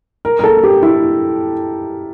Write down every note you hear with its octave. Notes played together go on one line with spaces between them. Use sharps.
A#4
A#4
A4
G4
E4